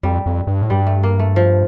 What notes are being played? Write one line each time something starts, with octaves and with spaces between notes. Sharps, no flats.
F2 G3
F2
G2
A2
G2 G3
A3
A#3
A3
F3